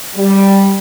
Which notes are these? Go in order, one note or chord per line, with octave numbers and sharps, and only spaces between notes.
G3